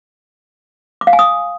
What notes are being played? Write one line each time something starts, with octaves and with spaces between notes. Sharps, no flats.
D6
F5
G#5
D#6